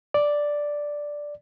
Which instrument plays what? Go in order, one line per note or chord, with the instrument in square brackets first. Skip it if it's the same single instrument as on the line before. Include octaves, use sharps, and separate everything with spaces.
[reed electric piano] D5